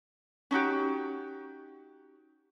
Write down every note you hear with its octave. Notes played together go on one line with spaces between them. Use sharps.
C#4 D#4 F#4 G4